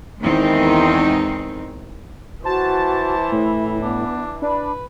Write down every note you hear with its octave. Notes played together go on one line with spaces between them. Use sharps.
E2 D#3 G#3 C4 D#4
E3 F#4 C5 A5
A2 E4
B3 D4
D4 B4 B5